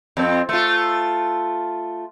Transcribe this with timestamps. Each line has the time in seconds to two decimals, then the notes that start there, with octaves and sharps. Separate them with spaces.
0.17 F2 C4
0.49 A3 F4